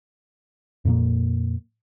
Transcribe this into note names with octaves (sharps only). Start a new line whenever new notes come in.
F2 A#2 A#3